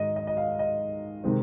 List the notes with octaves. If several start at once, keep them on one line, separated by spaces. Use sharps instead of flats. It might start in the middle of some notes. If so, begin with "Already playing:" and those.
Already playing: G#2 D#3 G#3 D#5
D#5
D#5
F5
D#5
C3 D#3 G#3 C4